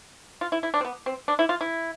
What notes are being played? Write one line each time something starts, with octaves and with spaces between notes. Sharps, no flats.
F4
E4
E4
D4
C4
B3
C4
D4
E4
F4
E4